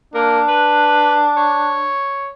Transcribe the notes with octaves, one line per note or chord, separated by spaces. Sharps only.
A#3 D4
B4
C#5